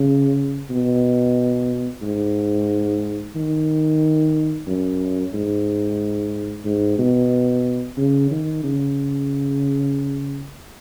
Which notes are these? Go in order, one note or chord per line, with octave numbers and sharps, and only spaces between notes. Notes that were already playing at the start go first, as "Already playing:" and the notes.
Already playing: C#3
B2
G#2
D#3
F#2
G#2
G#2
B2
C#3
D#3
C#3